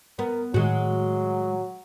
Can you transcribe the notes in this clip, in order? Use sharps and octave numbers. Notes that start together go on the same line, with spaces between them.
B3 A#4
A2 D#3 F#3 G#3 F#4